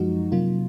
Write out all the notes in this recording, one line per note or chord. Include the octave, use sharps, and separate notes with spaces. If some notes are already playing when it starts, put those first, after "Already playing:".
Already playing: F#2 F3 G#3 D#4 F#4
C3 F#3 A#3 F4